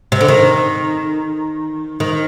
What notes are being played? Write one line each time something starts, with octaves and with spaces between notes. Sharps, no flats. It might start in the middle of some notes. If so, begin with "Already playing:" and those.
C3
D3
D#3
D#3